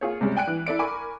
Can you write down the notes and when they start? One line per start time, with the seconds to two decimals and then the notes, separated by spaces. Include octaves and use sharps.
0.01 A#3 F4 G#4 C#5
0.21 C3 G3 G#3 C#4
0.36 D5 G5 G#5 F#6 D7
0.47 E3
0.66 E4 A4 D5 D7
0.79 A#4 G#5 B5 C#6 D6